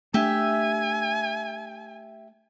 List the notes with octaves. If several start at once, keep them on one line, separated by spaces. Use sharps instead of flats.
A3 D4 G4 E5 G#5